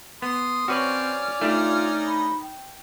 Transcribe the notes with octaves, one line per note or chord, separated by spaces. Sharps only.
B3 C6 D#6
C4 C#4 F#4 B4 C#5 D5 F6
A3 D4 D#4 F4 G4
B5
G5